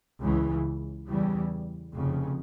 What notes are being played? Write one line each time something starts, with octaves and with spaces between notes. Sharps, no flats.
C#2 C#3 E3
E2 C#3 E3 G3
F1 F2 C#3